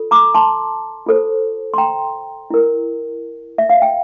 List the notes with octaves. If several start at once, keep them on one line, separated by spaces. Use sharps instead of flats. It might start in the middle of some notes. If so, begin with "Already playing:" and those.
Already playing: F4 A4
A#5 D6
A5 C6
F4 A4 C5
C6
G5 A#5
E4 A#4
E5
F5
G5